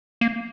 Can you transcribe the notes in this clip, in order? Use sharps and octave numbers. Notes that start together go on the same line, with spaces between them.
A#3